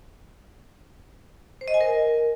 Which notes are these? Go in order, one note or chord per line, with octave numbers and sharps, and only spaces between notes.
C5
D#5
G#5
A#4